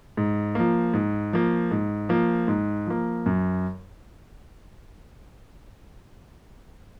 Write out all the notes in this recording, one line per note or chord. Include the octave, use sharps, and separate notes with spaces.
G#2
F3 A#3
G#2
F3 A#3
G#2
F3 A#3
G#2
F3 A#3
F#2